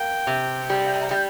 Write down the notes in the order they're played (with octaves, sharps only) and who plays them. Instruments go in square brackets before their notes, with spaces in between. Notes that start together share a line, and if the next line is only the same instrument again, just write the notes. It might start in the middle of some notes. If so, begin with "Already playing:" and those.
Already playing: [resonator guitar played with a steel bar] A#3 [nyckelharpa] G5
[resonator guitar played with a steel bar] C3
G3
G3